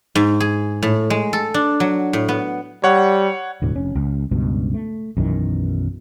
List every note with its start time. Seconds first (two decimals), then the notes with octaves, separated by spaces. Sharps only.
0.15 G#2
0.40 G#4
0.82 A2
1.10 G#3
1.33 A4
1.54 D4
1.80 F#3
2.13 A2
2.29 B3
2.84 G3 C#5 F#5
3.62 E1 D2 A2
3.76 F1 C#4
3.96 C#2
4.31 C#2 G2 B2
4.74 A3
5.17 B1 F#2 D#3 E3